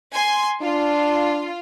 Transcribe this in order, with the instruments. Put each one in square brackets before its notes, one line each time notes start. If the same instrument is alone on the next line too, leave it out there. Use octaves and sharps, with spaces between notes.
[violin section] G#5 C6
[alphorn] D4 [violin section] F4